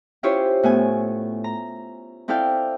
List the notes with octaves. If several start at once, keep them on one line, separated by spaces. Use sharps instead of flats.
C#4 E4 F4 G4 C5 C#5
A2 B3 G#5
A#5
C4 E4 A4 D5 F5 G5